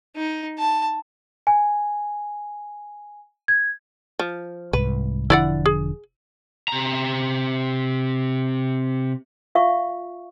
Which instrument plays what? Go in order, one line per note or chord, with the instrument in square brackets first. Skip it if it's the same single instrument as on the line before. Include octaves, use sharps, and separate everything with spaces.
[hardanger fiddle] D#4
A5
[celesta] G#5
G#6
[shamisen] F3
[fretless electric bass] C2 G#2 [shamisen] B4
[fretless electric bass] E1 D3 F3 [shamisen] E4 D5 F#5
[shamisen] G#4
[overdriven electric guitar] C3 A#5
[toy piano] F4 E5 F5 C#6